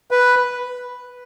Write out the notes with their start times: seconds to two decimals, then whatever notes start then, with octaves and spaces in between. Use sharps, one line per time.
0.11 B4